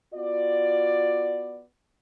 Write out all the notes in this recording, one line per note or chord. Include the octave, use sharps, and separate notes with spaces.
B3 F4 F#4 D5